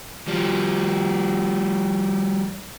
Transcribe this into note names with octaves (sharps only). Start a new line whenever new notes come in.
F3 G3